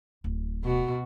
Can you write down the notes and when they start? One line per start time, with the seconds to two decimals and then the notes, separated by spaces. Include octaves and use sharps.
0.24 D1
0.64 B2 F#4